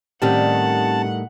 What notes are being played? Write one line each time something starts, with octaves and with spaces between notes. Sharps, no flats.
A2 D#3 G3 C4 C#4 G4 F#5 A5